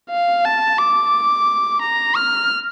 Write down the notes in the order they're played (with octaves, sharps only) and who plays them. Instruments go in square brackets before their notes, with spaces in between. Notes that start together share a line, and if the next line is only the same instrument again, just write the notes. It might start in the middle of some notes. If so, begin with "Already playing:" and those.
[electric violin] F5
A5
D6
A#5
F6